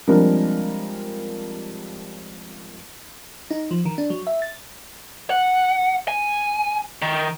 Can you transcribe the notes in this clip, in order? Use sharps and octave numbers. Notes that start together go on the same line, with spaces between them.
F3 G3 G#3 C4 D4 A#4
D#4
F3
D#3
D4
F#3
E5
A6
F#5
G#5
D#3